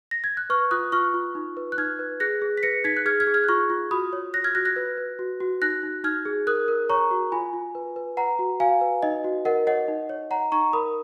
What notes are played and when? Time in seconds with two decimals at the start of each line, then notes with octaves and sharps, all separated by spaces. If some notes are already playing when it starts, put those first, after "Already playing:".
0.11 A#6
0.24 G#6
0.37 F#6
0.50 B4 C#6 F6
0.71 F4 D#6 F#6
0.92 F4 C#6 F6
1.14 F4
1.35 D#4
1.57 B4
1.72 F#6
1.78 D#4 F6 G#6
1.99 B4
2.20 G#4 F#6 A#6
2.42 G#4
2.57 B6
2.63 B4 A#6 C#7
2.84 D#4 G#6 B6
2.97 F#6
3.06 G#4 F6 G#6
3.20 F6 G#6
3.27 G#4
3.34 F6 G#6
3.44 F#6
3.48 F4 C#6 F6
3.70 F4
3.91 F#4 B5 D#6
4.13 C#5
4.34 C#5 F#6 A#6
4.44 F6 G#6
4.55 F#4 F#6 A#6
4.65 F#6 A#6
4.76 B4
4.98 B4
5.19 F#4
5.40 F#4
5.62 D#4 F#6 A#6
5.83 D#4
6.04 D#4 F6 G#6
6.25 G#4
6.47 A#4 D#6 F#6
6.68 A#4
6.90 C#5 A#5 C#6
7.11 F#4
7.32 F4 G#5 B5
7.54 F4
7.75 B4
7.96 B4
8.17 B4 F#5 A#5
8.39 F#4
8.60 F#4 F5 G#5
8.81 B4
9.02 D#4 D#5
9.24 F#4
9.45 A#4 D#5 F#5
9.67 C#5 D#5 F#5
9.88 D#4
10.09 C#5
10.31 C#5 F#5 A#5
10.52 D#4 A#5 C#6
10.73 A#4 B5 D#6